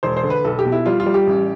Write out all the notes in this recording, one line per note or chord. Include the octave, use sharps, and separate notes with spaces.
E1 C5
C5
D3
B4
B1 A4
G4
B2
E4
G3 F4
F4
G3
G4
A1